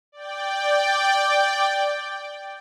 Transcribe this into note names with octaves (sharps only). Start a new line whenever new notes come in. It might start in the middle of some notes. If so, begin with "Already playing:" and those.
D5 G5